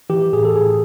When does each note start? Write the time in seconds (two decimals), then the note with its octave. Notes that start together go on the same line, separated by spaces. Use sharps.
0.10 E3 G4
0.33 A2 G#4
0.45 A4
0.56 A2 G#4